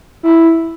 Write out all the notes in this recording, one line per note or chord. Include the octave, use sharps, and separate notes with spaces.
E4